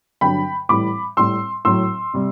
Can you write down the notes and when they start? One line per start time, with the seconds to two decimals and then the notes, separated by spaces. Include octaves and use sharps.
0.21 G2 D3 F#3 G5 B5
0.69 A2 E3 G3 B5 D6
1.17 A2 G3 C6 E6
1.65 A2 F#3 C6 E6
2.14 C3 G3